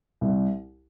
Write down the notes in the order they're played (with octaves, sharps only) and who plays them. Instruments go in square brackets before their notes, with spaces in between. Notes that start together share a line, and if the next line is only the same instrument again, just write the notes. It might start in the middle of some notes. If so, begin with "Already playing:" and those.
[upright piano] C2